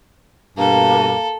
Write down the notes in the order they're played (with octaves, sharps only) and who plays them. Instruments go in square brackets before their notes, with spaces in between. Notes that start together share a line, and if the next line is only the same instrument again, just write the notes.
[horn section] G2 B2 [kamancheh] A#3 [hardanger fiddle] A4